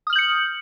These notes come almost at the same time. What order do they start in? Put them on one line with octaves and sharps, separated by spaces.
D#6 F6 F#7 G6 C#7